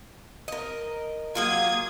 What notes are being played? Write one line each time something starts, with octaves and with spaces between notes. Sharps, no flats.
A#4 D#5
F#3 A#3 F4 G#4 D#6 G#6